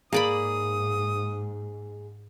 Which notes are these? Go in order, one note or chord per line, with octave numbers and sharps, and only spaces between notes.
G#2 A#3 G#4 D5 B5 D#6